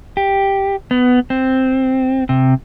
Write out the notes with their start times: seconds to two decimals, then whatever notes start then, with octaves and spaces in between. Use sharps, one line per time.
0.17 G4
0.91 B3
1.30 C4
2.29 C3